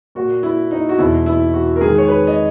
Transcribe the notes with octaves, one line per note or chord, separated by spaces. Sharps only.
A#2 F#4
E4
D#4
F#4
E2 B2 E4
E4
F#4
A#4
G#2 D#3 G#4
C#5
B4
D#5